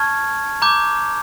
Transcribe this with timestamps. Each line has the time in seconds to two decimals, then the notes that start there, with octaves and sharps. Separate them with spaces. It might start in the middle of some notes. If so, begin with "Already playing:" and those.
Already playing: A5 C#6 F6 G#6
0.62 A#5 D6 G6